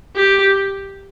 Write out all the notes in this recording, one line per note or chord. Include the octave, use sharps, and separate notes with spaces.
G4